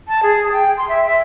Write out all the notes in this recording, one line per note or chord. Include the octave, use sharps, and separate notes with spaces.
A5
G#4
G5
C6
E5
E5